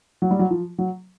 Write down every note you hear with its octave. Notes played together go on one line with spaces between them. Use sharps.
F#3
G3
F#3
F3
F#3